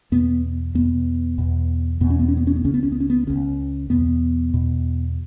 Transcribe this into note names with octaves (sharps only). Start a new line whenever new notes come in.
E2 B2 B3
E2 B2 B3
E2 B2
E2 B2 B3
C#4
B3
C#4
B3
C#4
B3
C#2 C#3 C#4
B3
C#4
B3
C#4
B3
C#2 C#3 C#4
E2 B2 B3
E2 B2